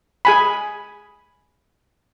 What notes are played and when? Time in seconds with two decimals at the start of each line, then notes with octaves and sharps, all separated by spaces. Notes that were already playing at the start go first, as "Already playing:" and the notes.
0.25 G#4 G#5 B5